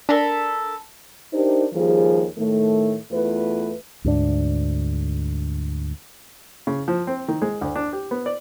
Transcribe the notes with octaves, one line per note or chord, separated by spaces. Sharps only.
D4 A4 A#4 B5
D4 D#4 G4 A#4 C5
D#2 F3 G3 G#4
A2 D#3 A3
E2 A3 F4 B4
D2 G#2 D4
C#3
F3
C4
D#3
G#3
D2
D4
G4
B3
D5